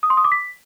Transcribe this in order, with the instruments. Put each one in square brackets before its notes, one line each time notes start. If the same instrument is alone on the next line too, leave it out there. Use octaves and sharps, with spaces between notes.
[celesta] D#6
C6
D#6
D6
B6